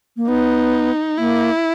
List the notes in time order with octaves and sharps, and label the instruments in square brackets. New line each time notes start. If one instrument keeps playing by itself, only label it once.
[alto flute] A#3
[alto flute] B3 [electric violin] D#4
[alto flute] A#3 [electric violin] E4